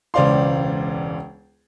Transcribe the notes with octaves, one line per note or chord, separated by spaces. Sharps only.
E1 C#2 C5 D5 F5 C6